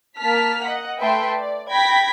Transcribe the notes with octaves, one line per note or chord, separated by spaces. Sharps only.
A#3 A5 F6 B6
D#5 F#5
A3 B4 E5 G5 A5 C6
D5
G5 B5 G#6 A#6 B6